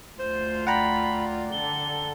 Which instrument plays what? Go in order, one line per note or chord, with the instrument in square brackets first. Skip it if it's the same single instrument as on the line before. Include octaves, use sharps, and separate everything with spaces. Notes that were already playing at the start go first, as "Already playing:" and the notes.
[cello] D2 F4 [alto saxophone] C5
[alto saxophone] D5 [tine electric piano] F#5 G5 A#5 [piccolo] B5
[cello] D3 A4 [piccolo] G7